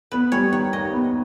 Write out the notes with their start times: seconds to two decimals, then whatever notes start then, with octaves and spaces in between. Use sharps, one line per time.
0.12 B3 B4
0.32 G3 C#5
0.52 D#3 C#5
0.72 D#2 D#5
0.93 B3